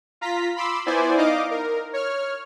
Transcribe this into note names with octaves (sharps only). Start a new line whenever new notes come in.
F4 A#5 B6
B5 C6 D6 E6
B3 E4 C5 D5 G#5
D#4 D#5 F5 D6
A#4
C#5 F6